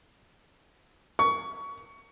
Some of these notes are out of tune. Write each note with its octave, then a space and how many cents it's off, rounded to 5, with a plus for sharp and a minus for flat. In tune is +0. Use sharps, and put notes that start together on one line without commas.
C#6 +20